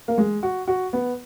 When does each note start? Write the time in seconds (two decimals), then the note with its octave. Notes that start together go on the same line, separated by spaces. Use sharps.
0.08 A#3
0.18 G#3
0.43 F#4
0.68 F#4
0.93 B3